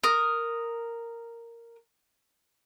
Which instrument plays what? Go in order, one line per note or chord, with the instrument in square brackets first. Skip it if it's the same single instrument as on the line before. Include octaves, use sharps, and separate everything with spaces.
[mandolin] A#4 D#6